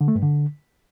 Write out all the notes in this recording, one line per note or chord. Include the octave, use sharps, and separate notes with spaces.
D3
A3
G2
D3